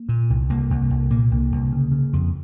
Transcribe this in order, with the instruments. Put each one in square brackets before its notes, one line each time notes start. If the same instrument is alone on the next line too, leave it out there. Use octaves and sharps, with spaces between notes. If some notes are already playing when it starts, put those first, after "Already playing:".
Already playing: [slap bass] A#3
A#2
C2
C2 A#3
C2
C2
A#2 A#3
C2
C2
C#3
C#3
F2